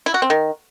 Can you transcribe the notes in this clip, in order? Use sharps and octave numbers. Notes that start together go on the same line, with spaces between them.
E4
F#4
C4
D#3